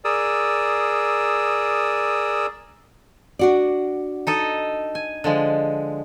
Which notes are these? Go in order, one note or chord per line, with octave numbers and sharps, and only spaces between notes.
G#4 A#4 D5 D#6 E6
D4 F#4 D5
D#4 A4 D#5
G#5
D3 F3 G#3